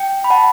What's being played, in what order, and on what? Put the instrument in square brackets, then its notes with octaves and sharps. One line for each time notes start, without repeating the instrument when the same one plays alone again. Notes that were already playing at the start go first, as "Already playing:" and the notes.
Already playing: [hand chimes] G5
B5
F#5 A5